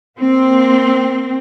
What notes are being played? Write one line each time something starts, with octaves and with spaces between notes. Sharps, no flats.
A#3 C4